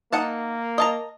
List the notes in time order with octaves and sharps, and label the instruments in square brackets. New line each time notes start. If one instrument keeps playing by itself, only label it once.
[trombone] A#3 [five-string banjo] D#4 F#5 A5
[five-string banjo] D#5 A5 A#5